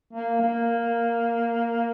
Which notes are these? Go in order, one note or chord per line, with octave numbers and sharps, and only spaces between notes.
A#3
A#3